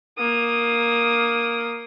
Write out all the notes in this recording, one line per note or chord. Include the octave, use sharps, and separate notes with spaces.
A#3 D#6